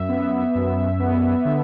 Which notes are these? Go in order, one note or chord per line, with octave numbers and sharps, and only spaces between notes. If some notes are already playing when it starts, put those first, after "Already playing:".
Already playing: F#2 E5
B3
F#2
B3
D3